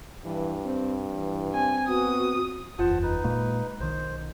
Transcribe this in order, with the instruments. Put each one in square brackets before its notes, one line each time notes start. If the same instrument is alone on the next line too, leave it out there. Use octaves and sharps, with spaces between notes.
[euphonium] G2 [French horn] E3
[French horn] C4
E3
[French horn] C4 [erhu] G#5
[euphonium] B3 [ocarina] F#4 [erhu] D#6
[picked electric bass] F#1 E2 [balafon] F4 [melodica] C5 F#5 A5
[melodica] D#4 B4
[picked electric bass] A#2 G#3 A#3
[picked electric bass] B1 D#3 [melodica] C5